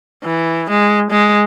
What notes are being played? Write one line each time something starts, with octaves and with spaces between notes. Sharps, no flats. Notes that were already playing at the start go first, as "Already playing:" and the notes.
E3
G#3
G#3